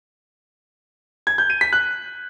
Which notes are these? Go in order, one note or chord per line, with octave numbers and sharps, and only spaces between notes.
G#6
G6
D#7
B6
F#6